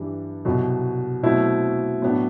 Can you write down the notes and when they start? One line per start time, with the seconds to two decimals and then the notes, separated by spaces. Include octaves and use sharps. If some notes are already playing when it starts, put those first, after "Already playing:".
Already playing: G2 E3 G3 D4
0.45 C2 B2 F#3
1.23 B2 F#3 A3 C4 E4
2.02 A2 F#3 B3 D4